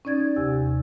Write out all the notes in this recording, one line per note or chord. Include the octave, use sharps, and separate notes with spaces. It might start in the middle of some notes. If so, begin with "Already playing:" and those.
C#4 D#4 D5 G#6 A6
D#2 C3 G4 G#5 E6